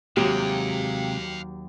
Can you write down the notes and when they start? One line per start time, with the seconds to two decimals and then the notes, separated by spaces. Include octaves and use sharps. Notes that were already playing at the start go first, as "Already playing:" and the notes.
0.17 D#2 C3 F#3 G#3 G4 F5 G5